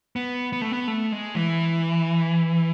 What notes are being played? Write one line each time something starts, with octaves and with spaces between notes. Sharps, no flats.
B3
B3
A3
B3
A3
G#3
E3